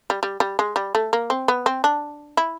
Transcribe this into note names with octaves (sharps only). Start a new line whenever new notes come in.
G3
G3
G3
G#3
G3
A3
A#3
C4
B3
C4
D4
E4